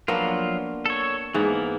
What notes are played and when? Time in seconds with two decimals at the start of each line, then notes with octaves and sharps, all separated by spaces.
0.08 F3 F#3 A#3 B3 D4 F4
0.86 A4 C#5
1.34 G#2 E3 A#3 B3